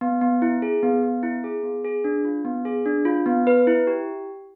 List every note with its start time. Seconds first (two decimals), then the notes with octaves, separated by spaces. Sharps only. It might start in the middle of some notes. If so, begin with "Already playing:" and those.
0.01 B3
0.21 B3
0.42 E4
0.62 G#4
0.83 B3
1.03 B3
1.23 E4
1.44 G#4
1.63 B3
1.84 G#4
2.04 D4
2.25 F4
2.45 B3
2.65 G#4
2.86 D4
3.05 F4
3.26 B3
3.47 B4
3.67 E4
3.87 G4